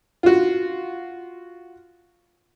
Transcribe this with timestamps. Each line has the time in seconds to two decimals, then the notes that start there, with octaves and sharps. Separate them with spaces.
0.23 F4 F#4